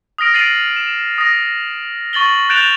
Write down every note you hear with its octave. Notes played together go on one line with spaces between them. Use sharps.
D#6 F6 A#6 D7
A6 C7 D7 D#7 F#7
E7
D#6 A#6
C#6 A6 F#7 G7
F#6 G6 A6 D7 E7 F7